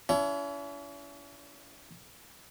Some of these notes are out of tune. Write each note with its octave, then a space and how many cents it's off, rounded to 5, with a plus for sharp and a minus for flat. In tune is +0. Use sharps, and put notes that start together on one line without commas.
C#4 +45 E4 +30